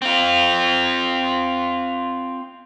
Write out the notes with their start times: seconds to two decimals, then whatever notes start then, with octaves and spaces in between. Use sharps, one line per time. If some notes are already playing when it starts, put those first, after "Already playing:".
0.02 C4 F4